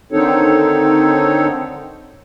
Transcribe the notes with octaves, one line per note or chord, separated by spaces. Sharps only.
D3 D#3 C4 D#4 A4 C#5